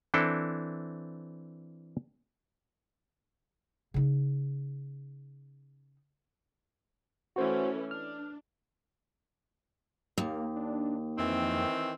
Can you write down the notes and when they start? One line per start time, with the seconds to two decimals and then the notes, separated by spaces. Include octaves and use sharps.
0.14 E3 C4 D4 E4 A4
3.94 C#3 D#4
7.36 E3 A3 C#4 F#4 C5
7.91 D4 F6
10.18 D#2 A#3
10.56 D4
11.18 F2 D#3 E3 C4